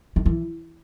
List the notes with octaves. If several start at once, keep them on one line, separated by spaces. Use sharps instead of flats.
D#3
E3